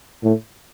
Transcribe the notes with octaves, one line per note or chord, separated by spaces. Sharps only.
A2